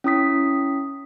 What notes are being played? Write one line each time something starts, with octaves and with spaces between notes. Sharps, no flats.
C#4 E4 D#6 B6